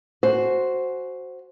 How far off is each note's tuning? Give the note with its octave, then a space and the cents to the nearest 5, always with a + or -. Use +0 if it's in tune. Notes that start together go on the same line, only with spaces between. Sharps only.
F#4 +0 C5 +0 G#5 +20